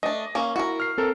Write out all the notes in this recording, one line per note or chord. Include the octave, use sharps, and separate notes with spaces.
A3 D4 D#5
A#3 C#4
E4 F#4 A#4
F6 C7
C4 A4 A#4